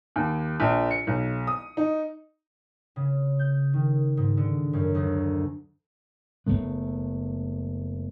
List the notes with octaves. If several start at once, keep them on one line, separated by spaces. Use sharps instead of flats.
D#2
A#1
C#7
B1
D#6
D#4
C#3
G6
D#3
G#2
D3
F#2
D2
F#1 G#2 A3 B3